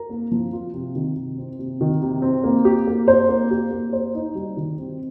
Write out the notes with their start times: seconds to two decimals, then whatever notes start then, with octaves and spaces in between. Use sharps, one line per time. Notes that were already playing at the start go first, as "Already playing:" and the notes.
Already playing: A#4
0.09 A#3
0.32 F3
0.53 F4
0.74 C3
0.95 D#3
1.16 C3
1.38 C4
1.59 C3
1.81 D#3
2.02 C3
2.22 C4
2.44 A#3
2.65 G4
2.87 A#3
3.08 C5
3.28 A#3
3.51 G4
3.71 A#3
3.93 C5
4.15 D#4
4.35 G3
4.57 D#3
4.78 C4